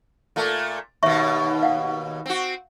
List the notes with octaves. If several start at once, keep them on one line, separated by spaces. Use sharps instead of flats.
A#2 A3
D#2 B2 C#5 E5 C#6
F5 F#5
C4 F#4